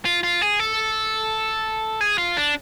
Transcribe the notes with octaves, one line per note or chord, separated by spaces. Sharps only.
F4
F4
G#4
A4
G#4
F4
D4